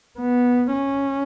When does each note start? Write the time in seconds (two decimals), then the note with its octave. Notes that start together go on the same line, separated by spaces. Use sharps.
0.19 B3
0.72 C#4